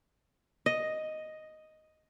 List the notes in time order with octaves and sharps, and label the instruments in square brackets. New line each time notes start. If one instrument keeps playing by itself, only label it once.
[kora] D#5